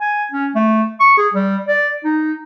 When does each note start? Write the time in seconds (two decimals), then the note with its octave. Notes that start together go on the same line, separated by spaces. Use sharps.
0.01 G#5
0.32 C#4
0.55 A3
1.00 C#6
1.18 G#4
1.34 G3
1.68 D5
2.04 D#4